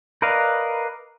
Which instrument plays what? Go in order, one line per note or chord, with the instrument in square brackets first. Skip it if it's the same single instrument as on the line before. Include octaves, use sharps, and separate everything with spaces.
[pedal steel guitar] A#4 B4 D5 D#5 F5